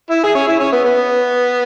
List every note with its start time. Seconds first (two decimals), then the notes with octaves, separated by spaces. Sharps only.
0.10 E4
0.24 G#4
0.35 C#4
0.48 E4
0.60 C#4
0.72 B3
0.84 B3